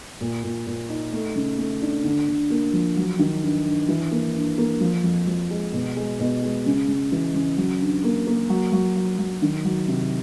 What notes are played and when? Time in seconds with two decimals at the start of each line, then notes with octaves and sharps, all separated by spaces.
0.21 A#2
0.44 A#2
0.67 A#2
0.89 D#4
1.13 A3
1.35 C#3
1.58 A3
1.82 D4
2.04 D3
2.28 D3
2.50 A#3
2.73 F3
2.96 F#3
3.19 D#3
3.42 G2
3.65 G2
3.88 E3
4.11 A#3
4.35 G2
4.58 A#3
4.80 F3
5.04 F2
5.27 F3
5.50 G#3
5.73 B2
5.96 G#3
6.20 B2
6.42 G#3
6.66 C#3
6.88 C#3
7.12 E3
7.35 C#3
7.57 F#3
7.80 G2
8.04 A#3
8.27 A#3
8.49 F#3
8.72 F#3
8.96 F#3
9.18 F#3
9.42 D#3
9.65 F#3
9.88 C3